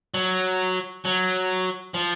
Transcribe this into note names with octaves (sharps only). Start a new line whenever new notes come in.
F#3
F#3
F3